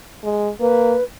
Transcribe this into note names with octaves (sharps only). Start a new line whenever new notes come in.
G#3
A#3 B4